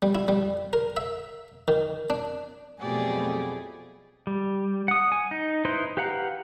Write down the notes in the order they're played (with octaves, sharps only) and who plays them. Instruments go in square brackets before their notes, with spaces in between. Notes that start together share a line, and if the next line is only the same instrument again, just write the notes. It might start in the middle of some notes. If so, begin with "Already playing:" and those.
[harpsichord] G3
E4
G3
A#4
E5
D#3
D4
[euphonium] F2 [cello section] B2 F#3 A3 [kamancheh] G4 D5 [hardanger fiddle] G#4
[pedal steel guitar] G3
F#5 D#6
G#5
D#4
D#4 E4 B4 C5 C6
G4 B4 F5 F#5 A#5